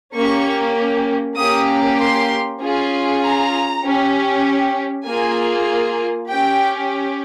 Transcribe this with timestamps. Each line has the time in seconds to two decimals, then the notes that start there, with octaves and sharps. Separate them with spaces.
0.14 A#3 C#4 G4 C#6
1.37 A#3 C#4 G4 D#6
1.99 C6
2.60 C#4 F4 G#4
3.22 A#5
3.83 C#4 G4
5.06 A#3 F4 G#4 G#5
6.29 C#4 G4 G5